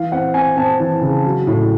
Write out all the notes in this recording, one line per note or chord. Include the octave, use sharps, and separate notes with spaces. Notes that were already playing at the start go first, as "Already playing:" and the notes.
Already playing: E3 F5
C4 F#5
C4 G#5
C4 A5
E3
C#3
F#3
A2